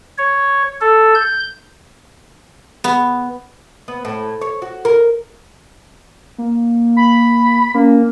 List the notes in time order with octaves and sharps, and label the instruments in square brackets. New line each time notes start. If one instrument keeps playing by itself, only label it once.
[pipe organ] C#5
A4
G6
[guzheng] B3
[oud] B3
A2
C#5
F#4
A#4
[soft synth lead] A#3
[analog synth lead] B5
[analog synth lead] A#3 [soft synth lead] C#4